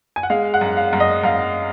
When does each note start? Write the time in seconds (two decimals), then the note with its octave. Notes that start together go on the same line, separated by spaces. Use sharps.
0.16 G#5
0.23 F#5
0.30 G#3 F5
0.54 F#5
0.61 F#2
0.77 F5
0.93 F#2
1.00 D#5
1.24 F#2 F5